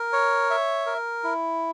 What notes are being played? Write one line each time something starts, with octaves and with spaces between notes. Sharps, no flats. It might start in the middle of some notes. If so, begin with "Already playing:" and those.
Already playing: A#4
C#5
E5
A#4
E4